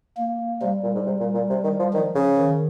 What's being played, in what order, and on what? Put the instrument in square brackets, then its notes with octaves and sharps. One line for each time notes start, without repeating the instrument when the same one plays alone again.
[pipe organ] A#3
[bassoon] C3 [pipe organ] G3
[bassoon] A#2
G#2
C3
A#2
A#2
C3
D#3
F3
[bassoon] D#3 [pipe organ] F3
[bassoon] C#3
[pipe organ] D#3